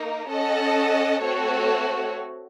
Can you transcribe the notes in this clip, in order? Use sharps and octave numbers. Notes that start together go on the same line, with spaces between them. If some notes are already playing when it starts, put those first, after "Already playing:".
Already playing: A#3 D#4 A#4
C#4 A4 D#5 F#5 A5
A3 C4 F#4 A4 C#5